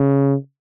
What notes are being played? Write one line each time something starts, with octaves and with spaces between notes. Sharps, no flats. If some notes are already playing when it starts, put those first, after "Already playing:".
Already playing: C#3